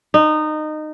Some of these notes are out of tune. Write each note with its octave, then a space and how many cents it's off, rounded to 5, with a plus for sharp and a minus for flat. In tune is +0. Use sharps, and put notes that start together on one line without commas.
D#4 -20